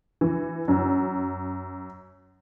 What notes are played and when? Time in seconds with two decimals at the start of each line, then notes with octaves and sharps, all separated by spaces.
0.21 E3
0.68 F#2